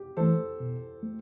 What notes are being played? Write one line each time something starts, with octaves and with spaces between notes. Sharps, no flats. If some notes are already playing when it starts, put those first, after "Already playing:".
Already playing: G4
E3 A3 A4 C5
B2
A3